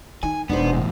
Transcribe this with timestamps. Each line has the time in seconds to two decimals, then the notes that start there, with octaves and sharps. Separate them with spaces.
0.23 D#3 G#5
0.49 E1 B3 D4 D#4 C5
0.73 E2 A2